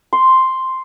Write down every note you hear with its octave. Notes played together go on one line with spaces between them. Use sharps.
C6